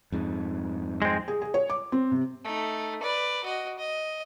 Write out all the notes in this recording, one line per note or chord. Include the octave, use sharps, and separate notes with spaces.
F2 G#2
G#3 C4
G#4
G#4
C#5
D6
C4
C3
A3 D#4
B4 D5
F#4 D#5
D#5